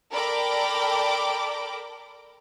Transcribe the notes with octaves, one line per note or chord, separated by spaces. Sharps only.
A4 A#4 D5 G5 B5 D6